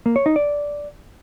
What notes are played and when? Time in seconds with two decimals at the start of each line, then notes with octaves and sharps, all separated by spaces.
0.06 A#3
0.16 C#5
0.26 D#4
0.36 D5